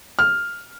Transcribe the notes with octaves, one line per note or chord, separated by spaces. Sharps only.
F6